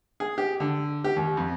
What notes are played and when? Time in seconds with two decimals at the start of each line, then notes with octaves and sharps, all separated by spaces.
0.20 G#4
0.38 G4
0.60 D3
1.04 G4
1.16 D#2
1.37 F2